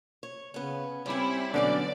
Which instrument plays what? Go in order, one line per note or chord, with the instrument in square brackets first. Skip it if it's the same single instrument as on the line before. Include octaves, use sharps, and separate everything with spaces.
[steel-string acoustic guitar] C#5
[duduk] C#3 [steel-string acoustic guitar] B3 C#4
[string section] G3 E4 [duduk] C4 [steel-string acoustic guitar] C#4 G#5
[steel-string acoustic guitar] B2 A3 D4 [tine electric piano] D3 B3 C#4 [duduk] F#3 [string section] D5